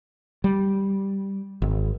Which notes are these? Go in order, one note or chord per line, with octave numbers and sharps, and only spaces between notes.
G3
G#1